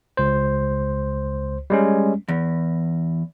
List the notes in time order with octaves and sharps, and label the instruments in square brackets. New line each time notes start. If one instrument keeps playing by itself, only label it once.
[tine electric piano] C#2 C5
G3 G#3 C#4
[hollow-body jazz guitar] E2